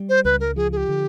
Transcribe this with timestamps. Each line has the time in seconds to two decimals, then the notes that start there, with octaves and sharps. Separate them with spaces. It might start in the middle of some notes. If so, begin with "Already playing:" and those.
Already playing: G3
0.09 C5
0.25 C#2 B4
0.40 A#4
0.56 F3 G#4
0.72 G#4
0.77 G4
0.89 D3